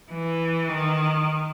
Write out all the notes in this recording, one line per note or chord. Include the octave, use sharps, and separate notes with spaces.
E3
D#3